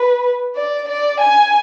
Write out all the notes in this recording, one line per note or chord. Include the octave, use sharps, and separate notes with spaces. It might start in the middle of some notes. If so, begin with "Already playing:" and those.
Already playing: B4
D5
D5
G#5